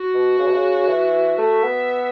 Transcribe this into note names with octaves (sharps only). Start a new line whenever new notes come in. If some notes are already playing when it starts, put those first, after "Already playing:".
Already playing: F#4
B2
C#3
B2
C#3
E3
A3 E5
B3